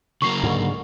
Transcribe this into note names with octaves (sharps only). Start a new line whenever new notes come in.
C#3 F#3 A#3 C#6 C7
G#2 D3